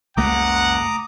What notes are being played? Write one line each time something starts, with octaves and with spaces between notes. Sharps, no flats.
F#1 C#2 A3 A#3 F#5 A#5 D6 D#6